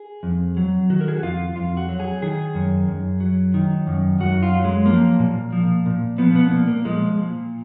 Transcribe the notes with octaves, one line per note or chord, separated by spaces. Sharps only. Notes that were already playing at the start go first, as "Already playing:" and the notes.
Already playing: G#4
F2
F#3
D#3 F#4
A#4
G#4
F#4
F2 F4
F2 F4
F#4
F#3
G#4
D#3 G#4
F#2
F#2
F#3
D#3
F#2
F#2 F#4
F4
F#3
G#3
F3 A#3
A#2
F3
A#2
F3 B3
B3
A#2 A#3
A#3
F3 G#3
A#2